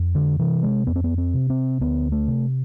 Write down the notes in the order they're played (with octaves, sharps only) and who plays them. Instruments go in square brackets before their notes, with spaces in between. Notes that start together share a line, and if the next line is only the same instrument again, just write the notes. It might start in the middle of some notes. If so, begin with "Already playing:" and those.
Already playing: [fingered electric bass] F2
D3
C3 E3
G#3
F2 B3
C4
B3
C4
C3
C4
D2 B3
A3
C3